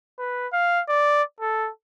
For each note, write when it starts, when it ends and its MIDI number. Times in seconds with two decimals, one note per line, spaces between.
0.18 0.48 71
0.53 0.81 77
0.88 1.23 74
1.41 1.69 69